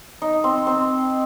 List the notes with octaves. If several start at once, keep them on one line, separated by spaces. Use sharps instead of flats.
D#4
C4
C4